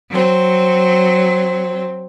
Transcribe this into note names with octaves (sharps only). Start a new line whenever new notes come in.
F#3 C4